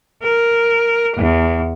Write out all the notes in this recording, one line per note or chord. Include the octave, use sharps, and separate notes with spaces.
A#4
E2